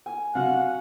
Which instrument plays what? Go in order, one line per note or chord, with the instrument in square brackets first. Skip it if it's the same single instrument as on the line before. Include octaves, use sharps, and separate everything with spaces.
[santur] G#5
[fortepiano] C3 F#4 [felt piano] F5 [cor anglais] F#5